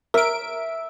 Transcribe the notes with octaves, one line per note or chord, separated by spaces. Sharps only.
A#4 E5 D7